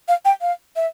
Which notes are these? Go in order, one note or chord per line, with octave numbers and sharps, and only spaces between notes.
F5
G5
F5
E5